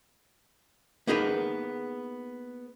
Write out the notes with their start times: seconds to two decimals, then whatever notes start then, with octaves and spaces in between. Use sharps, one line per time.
1.07 A#3 B3 D#4 G#4 A#4 B4